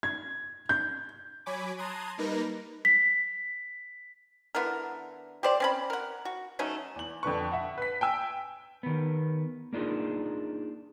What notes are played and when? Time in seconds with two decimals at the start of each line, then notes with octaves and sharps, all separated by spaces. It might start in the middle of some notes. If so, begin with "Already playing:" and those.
0.03 G#6
0.69 G6
1.46 F#3 C#5 G#5 B5 D6
1.77 A5 A#5 C6 D#6 F#6 G#6
2.18 G3 A#3 D#4 A#4 B4 A#6
2.85 B6
4.55 D3 B3 E4 A#4
5.43 G4 C5 D5
5.60 C4 C#4 B5
5.90 A#4 F#5
6.25 F#4
6.59 F#3 A3 C#4 D#4
6.96 E2 F#7
7.23 F2 D3 B4 C#6
7.52 E5 F#5
7.78 B4 B6
8.01 G5 G#5 E6
8.83 D#3 B3
9.73 A#3 D4 D#4 F4 G#4